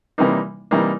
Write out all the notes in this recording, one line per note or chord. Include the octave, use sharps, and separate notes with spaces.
C3 E3 G3 A#3 D#4
C3 E3 G3 A#3 D#4